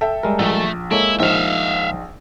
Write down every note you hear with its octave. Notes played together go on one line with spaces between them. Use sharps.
A4 E5 G5
G3 G#3 A#4
A#1 A3
G#3 A#3 E4 A4 C#5 D7
A#1 D#4 C5 E5 F5